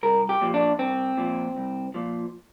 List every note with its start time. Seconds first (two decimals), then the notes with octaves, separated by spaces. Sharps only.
0.03 C2 A#4
0.29 G4
0.41 A#2 F3
0.54 D4
0.79 C2 C4
1.18 A#2 F3
1.57 C2
1.94 A#2 F3